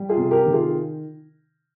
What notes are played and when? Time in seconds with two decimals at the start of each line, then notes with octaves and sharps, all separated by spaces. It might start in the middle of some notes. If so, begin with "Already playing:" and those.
Already playing: G3
0.09 F4 G#4
0.17 C3
0.31 G4 A#4
0.46 D#3
0.53 F4 G#4